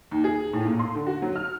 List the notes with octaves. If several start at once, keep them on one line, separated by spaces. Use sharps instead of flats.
D#2
G#4
A2
A#2
C6
D3
F#4
F#3
F6